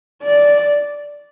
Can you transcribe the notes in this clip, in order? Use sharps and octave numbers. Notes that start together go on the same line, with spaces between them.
D5